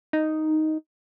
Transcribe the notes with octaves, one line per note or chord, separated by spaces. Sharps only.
D#4